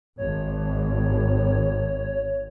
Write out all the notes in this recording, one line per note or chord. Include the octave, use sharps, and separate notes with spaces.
G#1 C#5